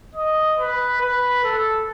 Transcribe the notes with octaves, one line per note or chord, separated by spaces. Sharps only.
D#5
B4
B4
A4